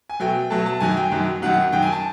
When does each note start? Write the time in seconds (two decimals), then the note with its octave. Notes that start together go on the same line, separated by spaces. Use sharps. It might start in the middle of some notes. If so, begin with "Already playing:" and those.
0.09 G#5
0.20 B2 F#3 A3 G5
0.50 B2 F#3 A3 A5
0.66 A5
0.80 F#2 D#3 F#3 G#5
0.97 G5
1.12 F#2 D#3 F#3
1.42 F#2 D#3 F#3 F#5
1.72 F#2 D#3 F#3 G5
1.82 G#5
1.92 A5